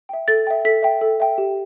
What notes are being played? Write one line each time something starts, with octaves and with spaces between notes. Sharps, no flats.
E5 G5
A4 A6
E5 G5
A4 B6
E5 G5
A4
E5 G5
G4